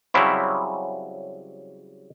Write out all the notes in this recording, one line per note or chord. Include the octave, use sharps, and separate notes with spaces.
C#3 F#3 G3 C4 E4